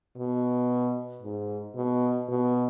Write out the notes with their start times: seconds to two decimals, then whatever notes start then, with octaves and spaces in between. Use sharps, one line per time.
0.17 B2
1.22 G#2
1.76 B2
2.29 B2